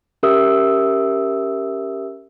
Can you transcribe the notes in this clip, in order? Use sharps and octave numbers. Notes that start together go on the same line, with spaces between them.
C#4 G4 A#4 E5 D#6 E6